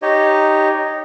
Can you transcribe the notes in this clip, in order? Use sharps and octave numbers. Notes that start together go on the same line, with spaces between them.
D#4 G4 C#5 D#5